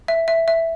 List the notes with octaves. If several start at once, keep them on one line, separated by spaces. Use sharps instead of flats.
E5
E5
E5